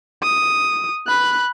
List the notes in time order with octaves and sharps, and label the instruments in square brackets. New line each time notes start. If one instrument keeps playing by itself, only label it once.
[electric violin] D#6
B5 F#6